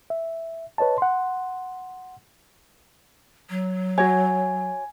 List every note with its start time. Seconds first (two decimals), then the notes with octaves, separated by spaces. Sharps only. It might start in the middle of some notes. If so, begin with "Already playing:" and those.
0.10 E5
0.78 B4 C#5 D#5 A5
0.98 F#5 C6
3.50 F#3
3.98 F#4 C#5 G#5